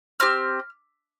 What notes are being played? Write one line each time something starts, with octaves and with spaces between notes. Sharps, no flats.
C4 G4 F6